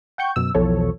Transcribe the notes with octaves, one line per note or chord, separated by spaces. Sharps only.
F#5 G5 C#6 G6
F#2 B2 E6
B1 E2 B2 F3 A4 C#5